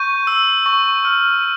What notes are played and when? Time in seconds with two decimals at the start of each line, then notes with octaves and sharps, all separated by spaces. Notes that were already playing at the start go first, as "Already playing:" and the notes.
Already playing: C#6 G6 D#7
0.27 E6
0.66 C#6
1.05 F6